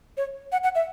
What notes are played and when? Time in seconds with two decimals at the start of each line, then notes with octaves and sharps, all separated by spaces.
0.17 C#5
0.52 F#5
0.63 F#5
0.75 E5